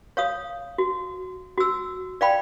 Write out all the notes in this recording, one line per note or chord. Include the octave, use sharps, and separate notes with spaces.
C#5 F5 D#6
F#4
F#4 E6
D5 F5 G5 B5